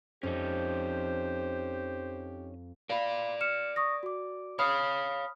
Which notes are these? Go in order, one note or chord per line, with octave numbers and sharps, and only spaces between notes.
F2 C#4 D#4 G4 C5
A#4 D5 F5 B5
F6 C#7 E7
C#6 D#6 A#6
F#4 D6
C#5 F5 B5 D#6 F6